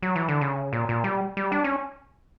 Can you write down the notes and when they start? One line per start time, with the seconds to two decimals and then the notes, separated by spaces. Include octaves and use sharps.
0.02 F#3
0.16 E3
0.28 D3
0.41 C#3
0.73 A#2
0.89 A#2
1.04 G3
1.37 G3
1.52 D4
1.64 C#4